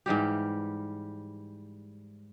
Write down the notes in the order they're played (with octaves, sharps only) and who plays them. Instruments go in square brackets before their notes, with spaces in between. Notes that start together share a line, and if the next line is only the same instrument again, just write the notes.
[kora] G#2 E3 G3 G4